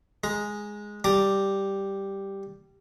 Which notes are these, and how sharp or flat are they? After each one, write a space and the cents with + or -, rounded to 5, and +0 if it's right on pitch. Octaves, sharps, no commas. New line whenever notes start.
G#3 +0 A#5 +15
G3 +0 A#5 +0 D6 +0